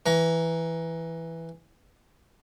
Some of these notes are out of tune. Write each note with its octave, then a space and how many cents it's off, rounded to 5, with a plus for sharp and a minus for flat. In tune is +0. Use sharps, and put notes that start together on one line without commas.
E3 +0 A#5 +15 C#6 +45